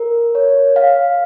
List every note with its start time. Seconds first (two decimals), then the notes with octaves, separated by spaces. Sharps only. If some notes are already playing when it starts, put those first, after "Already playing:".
Already playing: A#4
0.35 C#5
0.76 F5